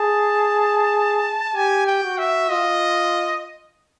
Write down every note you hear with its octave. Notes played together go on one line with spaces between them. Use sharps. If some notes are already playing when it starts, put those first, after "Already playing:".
Already playing: G#4 A5
G4 G#5
G5
F#4
E5
F4 D#5